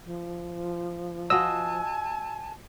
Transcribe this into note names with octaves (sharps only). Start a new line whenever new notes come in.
F3
F4 F#4 D#5 G#5 A5 E6